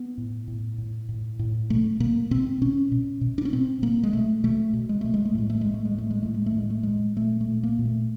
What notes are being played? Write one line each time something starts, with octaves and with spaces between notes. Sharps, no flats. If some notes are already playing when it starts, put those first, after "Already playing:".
Already playing: B3
A2
A2
A2
A2
A2
B2 A3
B2 A#3
B2 C4
B2 C#4
B2
B2
D4
C#4
B2 C4
B2 A#3
G#3
B2 A3
B2 A3
B2
G#3
B2 A3
G#3
A3
A2 G#3
A3
A2 G#3
A3
G#3
A2 A3
G#3
A2 A3
G#3
A3
A2 G#3
A3
A2 G#3
A#2 A3
A3
A#2
A#3
A#2
A3